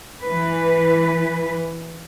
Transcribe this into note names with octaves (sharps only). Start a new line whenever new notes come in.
E3 B4